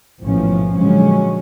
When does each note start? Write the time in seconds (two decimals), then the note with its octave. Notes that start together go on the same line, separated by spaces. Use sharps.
0.20 A1 G#2 B2 E3 F3 C#4
0.76 A#2 D3 F3 F#3 G#3 C#4